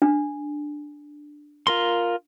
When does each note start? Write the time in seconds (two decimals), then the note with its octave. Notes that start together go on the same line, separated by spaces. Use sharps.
0.02 D4
1.67 F4 A#4 C6